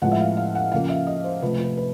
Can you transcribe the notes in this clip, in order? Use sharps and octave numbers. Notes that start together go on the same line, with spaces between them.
A2 F3 G#3 B3 F#5
E5
F5
F5
F#5
C#3 F3 A#3 F5
E5
D#5
C5
C3 F3 A3 B4
B4
B4